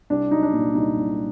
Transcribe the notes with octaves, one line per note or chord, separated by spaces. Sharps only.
C2 D4
F#3 D#4
D4
A#2
C2 D#4
C2